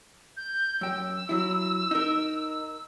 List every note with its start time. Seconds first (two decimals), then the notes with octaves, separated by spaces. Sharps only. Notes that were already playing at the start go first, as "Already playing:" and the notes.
0.37 G6
0.81 F#2 G5 E6
1.29 F#3 E4
1.91 D#4 A#4